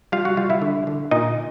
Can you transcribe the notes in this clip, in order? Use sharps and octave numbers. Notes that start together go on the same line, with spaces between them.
G3 F4 F5
F#4 F#5
G3 F4 F5
E4 E5
D3
D3
A#2 D#4 D#5